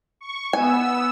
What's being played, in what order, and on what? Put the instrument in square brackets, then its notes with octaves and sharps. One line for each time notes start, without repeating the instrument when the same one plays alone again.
[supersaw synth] C#6
[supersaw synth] B3 E6 [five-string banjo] G#5